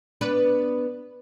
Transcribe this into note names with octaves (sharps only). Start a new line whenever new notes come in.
B3 D4 B4